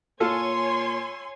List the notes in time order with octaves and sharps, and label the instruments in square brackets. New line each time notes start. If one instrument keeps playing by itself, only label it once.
[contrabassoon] A#2 [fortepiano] F4 A4 [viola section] C#5 G#5 C6